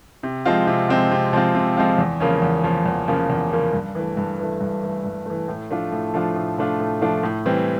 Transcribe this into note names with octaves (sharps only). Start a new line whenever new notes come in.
C3
F3 G#3 C4 F4
C3
F3 G#3 C4 F4
C3
F3 G#3 C4 F4
C3
F3 G#3 C4 F4
E2
C#3 F3 A#3 C#4
E2
C#3 F3 A#3 C#4
E2
C#3 F3 A#3 C#4
E2
C#3 F3 A#3 C#4
G2
E3 A3
G2
E3 A3
G2
E3 A3
G2
E3 A3
A2
F3 A3 D4 F4
A2
F3 A3 D4 F4
A2
F3 A3 D4 F4
A2
F3 A3 D4 F4
A2
E3 G3 C4